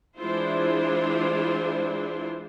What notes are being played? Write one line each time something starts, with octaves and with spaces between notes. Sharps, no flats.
E3 G#3 D4 E4 F4 C5